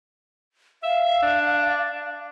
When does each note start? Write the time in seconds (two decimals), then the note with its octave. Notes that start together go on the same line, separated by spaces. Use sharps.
0.83 E5 F5
1.22 D4